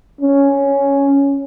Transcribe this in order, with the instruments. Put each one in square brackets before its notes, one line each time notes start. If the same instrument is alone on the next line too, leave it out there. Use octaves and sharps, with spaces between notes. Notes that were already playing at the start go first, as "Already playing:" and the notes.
[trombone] C#4